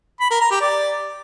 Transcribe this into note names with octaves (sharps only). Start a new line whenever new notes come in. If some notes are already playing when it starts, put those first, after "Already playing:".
B5
A#4
A#5
G4
D5